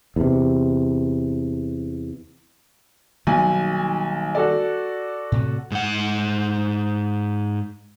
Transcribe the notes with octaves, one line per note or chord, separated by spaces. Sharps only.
E2 C3
B1 D#3 G3 A#3 G#5
F#4 A4 D5
A2 C3
G#2 F#5